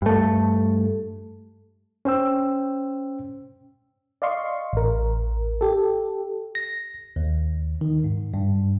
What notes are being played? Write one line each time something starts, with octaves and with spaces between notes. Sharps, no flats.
G2 A3
C#4 C5 G5 E6
D5 D#5 F5 C6 C#6
A1 A#4
G4 A4
A#6
D#2
D#3
G#2
G2